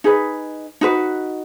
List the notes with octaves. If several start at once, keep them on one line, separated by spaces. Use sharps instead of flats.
D#4 G#4 B4
D#4 F#4 B4